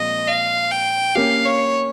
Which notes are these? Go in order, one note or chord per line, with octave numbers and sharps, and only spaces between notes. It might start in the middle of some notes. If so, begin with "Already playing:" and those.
Already playing: A#2 F3 G#3 C4 D#5
F5
G5
A#3 C#4 G4 F5
C#5